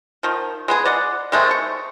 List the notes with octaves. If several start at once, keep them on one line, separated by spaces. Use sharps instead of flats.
D#3 F3
G#3 B3 G#4
D5 D#5 F#5
D#3 G#3 A3 C4
C#6